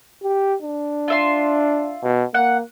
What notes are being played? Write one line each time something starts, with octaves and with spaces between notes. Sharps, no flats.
G4
D4
F4 E5 C6
B2
A#3 F#5